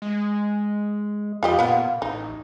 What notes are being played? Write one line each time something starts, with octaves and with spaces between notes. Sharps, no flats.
G#3
F2 F4 G4 D#5
A#2 B3 F4
A1 D#4